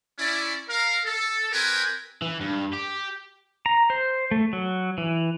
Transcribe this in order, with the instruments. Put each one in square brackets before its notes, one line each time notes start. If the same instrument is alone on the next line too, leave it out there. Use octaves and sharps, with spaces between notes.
[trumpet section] C#4 E4 D5
A#4 F5
A4
C4 G4 A#4 B4 G5 G#5
[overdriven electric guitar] E3
G2
G4
[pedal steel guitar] A#5
C5
A3
F#3
E3